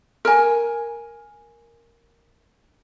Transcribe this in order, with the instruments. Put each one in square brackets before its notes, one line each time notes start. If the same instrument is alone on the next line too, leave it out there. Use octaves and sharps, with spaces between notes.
[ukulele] A#4 G#5